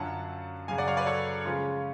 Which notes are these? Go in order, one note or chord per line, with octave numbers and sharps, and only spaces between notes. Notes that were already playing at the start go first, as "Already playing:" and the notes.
Already playing: F#2 D3 F#3 C#4 F4 F#5 A5
F#2 C#3 F#3 F5 G#5
D5 F#5
C#5 F5
B4 D5
A4 C#5
C#3 F3 G#3 C#4 F4